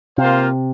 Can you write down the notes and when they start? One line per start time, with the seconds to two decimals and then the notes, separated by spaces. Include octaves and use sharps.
0.18 C3 A#3 F4 C5 F5